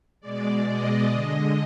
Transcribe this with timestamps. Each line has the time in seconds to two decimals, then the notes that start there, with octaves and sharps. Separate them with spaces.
0.21 B2 G#3 D5
0.67 D#5
1.12 D3 G#3